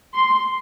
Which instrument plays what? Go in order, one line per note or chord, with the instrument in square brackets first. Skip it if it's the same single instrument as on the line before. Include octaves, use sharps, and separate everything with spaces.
[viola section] C6